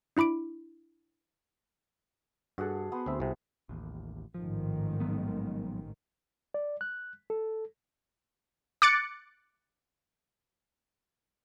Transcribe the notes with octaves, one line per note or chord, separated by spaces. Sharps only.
D4 E4 B5 D6 D7
G2 F#4 G#4 A4 F#5
B3 C5 D#6
D2 C4 E5
C2 C3
A1 D#2
A1 G#2 D#3 F3
F3 F#3 B3
D5
F#6
A4
D6 F#6 A6 C#7 D7